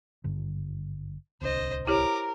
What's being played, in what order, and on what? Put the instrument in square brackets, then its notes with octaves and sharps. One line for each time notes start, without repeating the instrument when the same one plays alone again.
[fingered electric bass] G#1 G2 D3
[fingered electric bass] D1 C2 D4 [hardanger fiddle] C5 D#5
[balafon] E4 G4 C#5 [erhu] A#4 [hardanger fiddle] A#5 D6